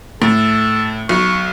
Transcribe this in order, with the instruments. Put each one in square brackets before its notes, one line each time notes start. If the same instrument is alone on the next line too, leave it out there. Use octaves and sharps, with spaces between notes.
[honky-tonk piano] A2 [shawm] A4
[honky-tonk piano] B1 [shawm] C#6